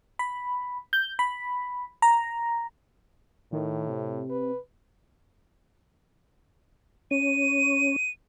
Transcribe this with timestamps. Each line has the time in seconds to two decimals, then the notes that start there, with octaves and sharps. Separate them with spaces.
0.19 B5
0.93 G6
1.19 B5
2.02 A#5
3.53 A2 D#3
3.89 C3
4.30 B4
7.11 C#4 D#7